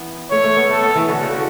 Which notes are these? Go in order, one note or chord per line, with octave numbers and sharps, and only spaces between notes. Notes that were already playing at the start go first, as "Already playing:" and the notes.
Already playing: E3 B3
A3 C#5
A3
B3
A3 A4
B3
E3
D3 F#4
C#3
D3